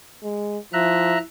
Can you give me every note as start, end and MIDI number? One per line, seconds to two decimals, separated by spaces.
0.23 0.58 56
0.73 1.17 53
0.73 1.24 64
0.73 1.18 76
0.73 1.18 82
0.73 1.18 90